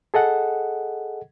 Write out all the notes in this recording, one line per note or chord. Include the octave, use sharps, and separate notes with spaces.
G#4 A4 D#5 F#5